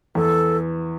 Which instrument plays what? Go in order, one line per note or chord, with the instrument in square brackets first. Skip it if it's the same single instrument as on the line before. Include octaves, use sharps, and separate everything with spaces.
[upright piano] E2 E3 [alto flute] A4